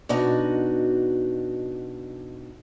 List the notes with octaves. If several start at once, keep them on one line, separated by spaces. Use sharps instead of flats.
B2 D4 D#4 F#4